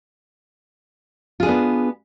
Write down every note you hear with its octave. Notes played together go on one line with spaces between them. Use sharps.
B3 D4 F4 G#4